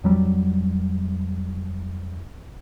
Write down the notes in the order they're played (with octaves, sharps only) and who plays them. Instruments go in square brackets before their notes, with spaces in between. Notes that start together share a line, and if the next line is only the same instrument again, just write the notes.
[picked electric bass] F2 F#3 G3